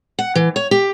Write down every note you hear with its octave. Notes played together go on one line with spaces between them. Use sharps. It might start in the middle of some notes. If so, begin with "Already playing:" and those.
F#5
E3
C#5
G4